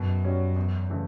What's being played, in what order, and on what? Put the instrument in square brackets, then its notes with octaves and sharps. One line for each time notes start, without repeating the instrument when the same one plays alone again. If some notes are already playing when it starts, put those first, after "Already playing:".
Already playing: [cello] F#2 [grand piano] B2
[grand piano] G3 C#4 F#4 C#5
E2
C#3 E3 A3